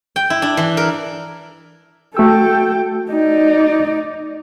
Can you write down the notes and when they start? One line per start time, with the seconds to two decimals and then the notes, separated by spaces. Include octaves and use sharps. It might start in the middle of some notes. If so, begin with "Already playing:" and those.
0.16 G5
0.30 E4
0.42 D4
0.57 E3
0.77 A#4
2.17 A3 F#4 A4 G5 E6
3.10 D#4 D5